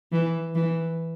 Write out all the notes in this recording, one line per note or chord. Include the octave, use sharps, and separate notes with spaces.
E3
E3